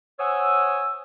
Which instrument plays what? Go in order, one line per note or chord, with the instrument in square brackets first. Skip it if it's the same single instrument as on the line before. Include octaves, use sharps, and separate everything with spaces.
[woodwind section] C5 C#5 F#5 G#5 D#6 E6